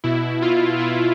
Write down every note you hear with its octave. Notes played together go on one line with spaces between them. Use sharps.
B2 E4
F4
E4